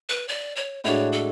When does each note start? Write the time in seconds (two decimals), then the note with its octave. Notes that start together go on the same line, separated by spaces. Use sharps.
0.09 B4
0.28 D5
0.56 C#5
0.84 A2 G#3 D4 F#4 C#5
1.13 A4